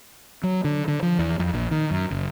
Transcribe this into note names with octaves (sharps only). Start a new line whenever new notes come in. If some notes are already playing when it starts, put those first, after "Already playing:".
F#3
D3
D3
F3
E2
F2
A#1
D#3
F#2
F#1